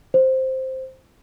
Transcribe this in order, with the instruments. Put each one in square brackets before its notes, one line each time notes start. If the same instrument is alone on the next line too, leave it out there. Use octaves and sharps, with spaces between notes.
[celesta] C5